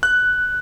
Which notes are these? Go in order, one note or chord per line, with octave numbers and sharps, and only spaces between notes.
F#6